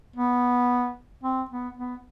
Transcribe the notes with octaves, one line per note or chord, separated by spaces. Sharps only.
B3
C4
B3
B3